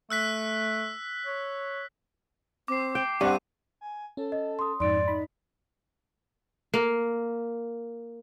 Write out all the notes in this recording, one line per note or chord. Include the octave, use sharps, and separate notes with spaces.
A3 E6 F#6 B6
C#5
C4 D6 C7
G5
G2 C4 D5 F#5 F#6 D#7
G#5
C#4 A4
D#5
C6 D#6
F2 G#2 D#4 D5 C6 D7
D#4 B5
A#3